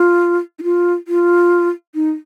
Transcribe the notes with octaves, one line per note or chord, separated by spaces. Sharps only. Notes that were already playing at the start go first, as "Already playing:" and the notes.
Already playing: F4
D#4
F4
F4
D#4